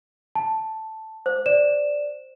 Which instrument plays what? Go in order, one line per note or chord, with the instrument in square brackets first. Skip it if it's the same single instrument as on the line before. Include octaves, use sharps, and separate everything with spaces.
[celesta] A5
[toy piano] C5
[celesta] D5 E7